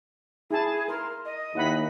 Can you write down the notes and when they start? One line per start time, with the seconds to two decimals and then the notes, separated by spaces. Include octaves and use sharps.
0.51 E4 G#4 A5
0.88 A#4 C6
1.25 D#5
1.55 D#2 E4 F#5 B5